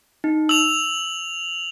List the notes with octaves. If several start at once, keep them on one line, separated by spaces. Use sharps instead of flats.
D#4
E6 F7 F#7